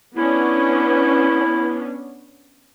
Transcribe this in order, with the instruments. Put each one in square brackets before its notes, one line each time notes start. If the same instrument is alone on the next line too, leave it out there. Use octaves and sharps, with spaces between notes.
[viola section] B3 C#4 D4 [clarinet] E4